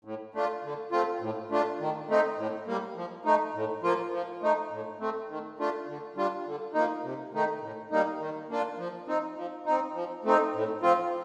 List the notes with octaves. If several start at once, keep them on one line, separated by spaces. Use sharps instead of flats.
A2
A3 D4 F4
D3
A3 C4 F4
A2
A3 D4 F4
D#3
A3 C4 D#4
A2
G3 A#3
F3
A3 D#4
A2
F3 A#3 F4
F3
A3 D#4
A2
A3 C4
D#3
A3 D4 F4
D3
G3 D4 F4
D3
F3 A#3 D#4
C3
D#3 A3 D#4
A2
G3 A#3 D#4
D#3
A#3 D4 F4
F3
C4 D#4
F3
C4 D#4
F3
A3 C4 D#4
A2
F3 C4 F4